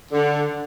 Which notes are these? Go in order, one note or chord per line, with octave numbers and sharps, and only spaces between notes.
D3